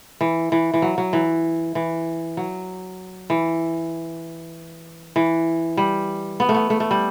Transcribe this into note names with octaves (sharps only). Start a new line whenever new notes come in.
E3
E3
E3
F#3
F#3
E3
E3
F#3
E3
E3
G3
B3
A3
B3
A3
A3
G3